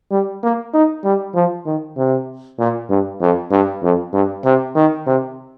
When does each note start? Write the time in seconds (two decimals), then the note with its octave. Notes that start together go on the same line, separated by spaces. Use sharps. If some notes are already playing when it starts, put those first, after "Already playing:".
0.11 G3
0.43 A#3
0.74 D#4
1.04 G3
1.35 F3
1.66 D#3
1.97 C3
2.59 A#2
2.90 G2
3.21 F2
3.51 G2
3.83 F2
4.13 G2
4.44 C3
4.75 D#3
5.06 C3